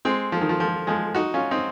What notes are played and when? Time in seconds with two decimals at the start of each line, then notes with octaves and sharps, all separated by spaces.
0.05 G#3 C4
0.32 F3
0.41 D#3
0.49 F3
0.60 F3
0.87 F3 G#3
1.15 D#4 F#4
1.34 C#4 F4
1.51 C4 D#4